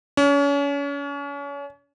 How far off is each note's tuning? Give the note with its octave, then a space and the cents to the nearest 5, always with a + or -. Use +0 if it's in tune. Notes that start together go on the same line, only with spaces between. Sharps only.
C#4 +35